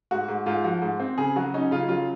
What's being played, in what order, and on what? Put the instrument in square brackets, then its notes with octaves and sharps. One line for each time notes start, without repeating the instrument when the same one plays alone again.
[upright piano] G#2 F#4
G#2
G#2 F4
F3 F#4
G#2
C4
C#3 G#4
F#3 F#4
C#4 D#4
C#3 F4
F#3 F4